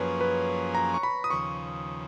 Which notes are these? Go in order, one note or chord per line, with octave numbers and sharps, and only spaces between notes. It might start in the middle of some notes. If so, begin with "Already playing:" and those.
Already playing: F#2 F3 A#3 C#4 G#4 B4 C#5
B4
A#5
C#6
B5
D#6
D#2 C#3 F3 C#6